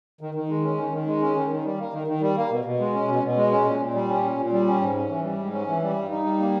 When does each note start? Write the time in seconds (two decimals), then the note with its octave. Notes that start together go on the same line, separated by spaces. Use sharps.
0.21 D#3
0.34 D#3
0.49 G#3
0.64 C#4
0.78 D#3
0.92 D#3
1.07 G#3
1.21 C#4
1.36 D#3
1.50 D#3
1.64 G3
1.79 A#3
1.93 D#3
2.07 D#3
2.21 G3
2.36 A#3
2.50 B2
2.65 B2
2.80 G#3
2.93 C#4
3.08 B2
3.23 B2
3.37 G#3
3.51 C#4
3.66 A#2
3.80 A#2
3.94 G3
4.09 C#4
4.23 A#2
4.37 A#2
4.52 G3
4.66 C#4
4.81 G#2
4.95 C#4
5.09 E3
5.23 G3
5.38 G#2
5.53 C#4
5.67 E3
5.82 G3
5.96 G2
6.10 D#4
6.25 G3
6.39 A#3